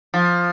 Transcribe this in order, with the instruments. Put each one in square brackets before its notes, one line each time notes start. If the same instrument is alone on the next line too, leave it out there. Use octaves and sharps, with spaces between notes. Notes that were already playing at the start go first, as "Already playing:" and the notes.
[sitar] F3